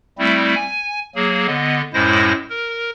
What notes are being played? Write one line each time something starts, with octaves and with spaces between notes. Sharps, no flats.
G3 A3 C4 E4
G#5
F#3 A#3 G#4
D3 B3 D#5
F#2 A2 G#3 E4 C5 A#6
A#4